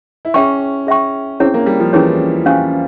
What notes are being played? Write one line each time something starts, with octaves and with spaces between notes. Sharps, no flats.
E4
C#4 G#4 E5 G5 C#6
G#4 E5 G5 C#6
C4 C#4 E4 G#4 C#5
A#3
G3
F3
E3 C#4 E4 G#4 C#5
C#4 G4 C5 F5 G#5